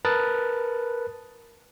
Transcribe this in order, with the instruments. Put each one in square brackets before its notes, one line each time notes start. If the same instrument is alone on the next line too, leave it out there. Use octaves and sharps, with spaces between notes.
[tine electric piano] A#4 B4 A5 D#6 F#6 A6